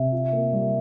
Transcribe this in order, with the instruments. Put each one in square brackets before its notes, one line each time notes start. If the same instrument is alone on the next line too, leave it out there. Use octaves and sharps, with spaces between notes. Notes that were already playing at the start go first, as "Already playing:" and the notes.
Already playing: [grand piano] C3 [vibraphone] E5
[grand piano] F4
A#3
G3